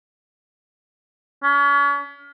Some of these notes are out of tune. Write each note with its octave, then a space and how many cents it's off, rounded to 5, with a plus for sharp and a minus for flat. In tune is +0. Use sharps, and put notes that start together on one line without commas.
C#4 +40